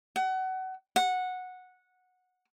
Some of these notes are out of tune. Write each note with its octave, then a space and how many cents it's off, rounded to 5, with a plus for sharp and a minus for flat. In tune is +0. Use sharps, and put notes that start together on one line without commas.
F#5 +25
F#5 -10